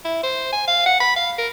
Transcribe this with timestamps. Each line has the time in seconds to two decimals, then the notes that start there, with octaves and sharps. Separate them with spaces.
0.05 E4
0.23 C5
0.52 G#5
0.67 F5
0.86 F#5
1.00 B5
1.16 F5
1.38 A#4